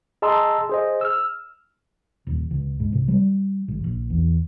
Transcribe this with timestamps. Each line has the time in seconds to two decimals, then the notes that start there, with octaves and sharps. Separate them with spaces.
0.22 G#4 D#5 A5 A#5 C6 E6
0.69 G#4 C5 D#5
1.01 E6 F6
2.27 D#1
2.51 C#2
2.80 G#2
2.93 C2
3.08 G3
3.68 G#1
3.84 A#1
4.10 E2